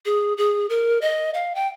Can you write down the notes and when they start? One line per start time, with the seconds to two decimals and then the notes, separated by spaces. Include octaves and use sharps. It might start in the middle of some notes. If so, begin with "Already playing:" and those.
0.06 G#4
0.37 G#4
0.70 A#4
1.02 D#5
1.34 F5
1.55 G5